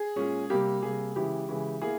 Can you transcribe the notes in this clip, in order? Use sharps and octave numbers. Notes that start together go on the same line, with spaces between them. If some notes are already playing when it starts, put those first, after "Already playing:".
Already playing: G#4
A#2 G#3 C#4
C3 G3 A#3 G4
C3 G3 A#3 G#4
C#3 E3 G#3 E4 G4
C#3 E3 G#3 E4
A#3 E4 G#4